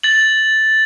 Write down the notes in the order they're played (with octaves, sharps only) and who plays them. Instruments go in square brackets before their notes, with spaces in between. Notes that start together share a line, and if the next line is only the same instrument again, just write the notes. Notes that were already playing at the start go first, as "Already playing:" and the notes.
[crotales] A6 F#7